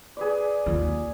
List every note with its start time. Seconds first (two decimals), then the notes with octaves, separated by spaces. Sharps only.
0.17 G#4 B4 D5
0.66 D#2 F4